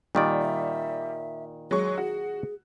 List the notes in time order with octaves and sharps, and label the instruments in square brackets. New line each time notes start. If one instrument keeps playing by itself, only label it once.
[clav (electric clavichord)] A#2 D#3 D5 [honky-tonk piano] G3
[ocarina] E5
[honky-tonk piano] F#3 G#3 C#6 [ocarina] G#4
[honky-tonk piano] F#4